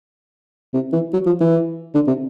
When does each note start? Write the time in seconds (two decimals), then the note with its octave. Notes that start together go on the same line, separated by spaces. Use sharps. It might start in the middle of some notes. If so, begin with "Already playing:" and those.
0.74 C3
0.93 E3
1.13 F#3
1.26 F3
1.40 E3
1.94 D3
2.08 C3